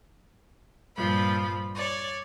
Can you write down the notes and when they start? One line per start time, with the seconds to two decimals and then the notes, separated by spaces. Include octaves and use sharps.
0.97 G2 A#2 F3 F4 B5
1.75 C#5 D5